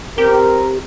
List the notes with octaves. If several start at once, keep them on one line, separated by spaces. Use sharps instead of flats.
C4 G4 A#4